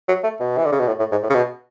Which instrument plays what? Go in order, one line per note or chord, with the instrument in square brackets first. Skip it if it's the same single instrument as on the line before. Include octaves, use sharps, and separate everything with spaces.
[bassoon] F#3
A3
B2
E3
D3
C#3
B2
A2
A2
G#2
A2
C#3
B2